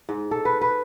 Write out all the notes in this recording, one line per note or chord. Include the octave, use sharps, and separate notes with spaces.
G#2
A4
B4
B4